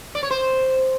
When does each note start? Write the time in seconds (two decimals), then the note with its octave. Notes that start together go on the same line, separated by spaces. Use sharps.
0.15 D5
0.23 C#5
0.30 C5